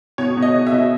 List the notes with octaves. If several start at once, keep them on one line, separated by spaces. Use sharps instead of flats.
B2 C#5
B2
D#5
B2
E5
B2